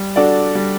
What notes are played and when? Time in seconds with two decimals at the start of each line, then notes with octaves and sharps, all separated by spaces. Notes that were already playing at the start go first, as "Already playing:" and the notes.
Already playing: G3
0.16 D4 F#4 A4 D5
0.55 G3